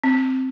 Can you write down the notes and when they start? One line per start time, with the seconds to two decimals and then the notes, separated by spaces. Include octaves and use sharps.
0.04 C4